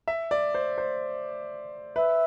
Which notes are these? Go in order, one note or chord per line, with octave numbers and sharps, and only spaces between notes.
E5
D5
C5
C5
B4 E5